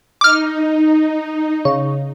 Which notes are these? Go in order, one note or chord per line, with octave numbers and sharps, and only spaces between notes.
D#4 D6 F6
C#3